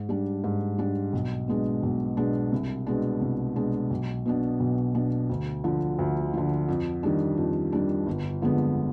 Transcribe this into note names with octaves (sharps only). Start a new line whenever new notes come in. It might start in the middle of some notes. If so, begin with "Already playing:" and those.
Already playing: G#2
G3 D4
G#2
G3 D4
B1
B2 G#3 D4
B1
B2 G#3 D4
C2
B2 G#3 D4
C2
B2 G#3 D4
B1
B2 B3 D4
B1
B2 B3 D4
D2
D3 F3
D2
D3 F3
F2
D#3 G3 D4
F2
D#3 G3 D4
G1
F2 D3 G#3 B3